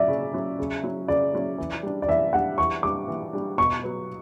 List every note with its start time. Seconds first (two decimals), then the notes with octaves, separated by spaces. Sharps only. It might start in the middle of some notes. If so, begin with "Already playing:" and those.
Already playing: F#3 C#4 E4 D5 E5
0.08 C#3
0.33 F#3 C#4 E4
0.59 C#3
0.83 F#3 C#4 E4
1.08 C#3 D5
1.34 F#3 C#4 E4
1.58 E3
1.83 G3 D4
2.02 D5
2.08 E3 E5
2.33 G3 D4 F#5
2.58 E3 C#6
2.83 G3 D4 D6
3.08 E3
3.33 G3 D4
3.58 B2 C#6
3.83 F#3 B3